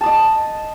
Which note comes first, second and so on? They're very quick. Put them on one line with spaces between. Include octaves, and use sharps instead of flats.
A5 D#6 D#5